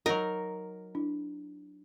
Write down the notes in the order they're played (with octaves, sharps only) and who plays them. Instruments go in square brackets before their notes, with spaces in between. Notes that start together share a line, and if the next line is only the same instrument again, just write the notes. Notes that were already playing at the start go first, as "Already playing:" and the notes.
[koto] F#3 D#4 [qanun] A#4
[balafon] D4 E4